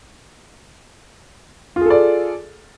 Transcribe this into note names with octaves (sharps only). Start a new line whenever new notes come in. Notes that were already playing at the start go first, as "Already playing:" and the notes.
F4 G#4 A4 D5